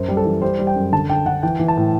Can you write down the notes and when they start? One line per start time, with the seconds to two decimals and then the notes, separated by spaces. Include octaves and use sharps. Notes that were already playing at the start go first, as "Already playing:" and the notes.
Already playing: F#2 C5
0.08 G3
0.17 A4
0.25 E3
0.41 G3 C5
0.59 G3
0.67 G5
0.76 F#2
0.92 D3 A5
1.09 D3 G5
1.26 D3 F#5
1.43 E3 G5
1.60 E3
1.68 A5
1.77 A2